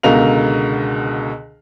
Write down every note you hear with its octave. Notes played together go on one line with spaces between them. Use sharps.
C#2 B2 D3 A#4 F5 F7